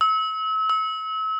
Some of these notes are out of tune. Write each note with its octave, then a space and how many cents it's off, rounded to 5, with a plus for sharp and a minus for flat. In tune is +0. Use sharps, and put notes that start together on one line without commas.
E6 -35
E6 -35